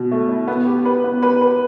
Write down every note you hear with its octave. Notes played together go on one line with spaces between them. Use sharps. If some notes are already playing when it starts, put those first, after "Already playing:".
Already playing: B2
A3
E4
B3
G4
B4
B3
B4
B4